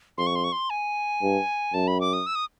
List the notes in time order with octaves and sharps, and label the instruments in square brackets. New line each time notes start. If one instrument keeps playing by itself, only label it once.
[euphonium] F2 [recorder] C6
[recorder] C#6
C6
C#6
C6
G#5
[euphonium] G2
[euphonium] F#2 [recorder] A5
[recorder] B5
D6
D#6
E6
D#6